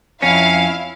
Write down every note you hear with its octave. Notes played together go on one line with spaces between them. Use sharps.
F2 C#4 E4 F5